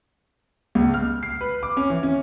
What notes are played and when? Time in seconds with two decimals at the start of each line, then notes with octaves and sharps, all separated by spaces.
0.75 C#2
0.94 F6
1.23 C7
1.41 B4
1.63 D6
1.77 C#4
1.90 E3
2.03 C#4